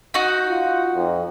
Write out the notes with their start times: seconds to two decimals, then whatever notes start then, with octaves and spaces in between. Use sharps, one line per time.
0.14 D#4 F#4
0.49 F4
0.95 F2